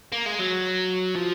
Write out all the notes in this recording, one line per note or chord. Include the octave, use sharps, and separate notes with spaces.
A#3
G#3
F#3
F3